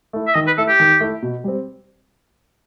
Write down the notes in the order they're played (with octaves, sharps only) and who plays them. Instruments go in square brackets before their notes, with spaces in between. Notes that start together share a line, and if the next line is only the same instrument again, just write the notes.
[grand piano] A3 E4
[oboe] E5
[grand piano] D#3 [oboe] D#5
[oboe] B4
[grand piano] A3 E4 [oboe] A4
[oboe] G4
[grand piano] D#3
A3 E4
B2
G3 C4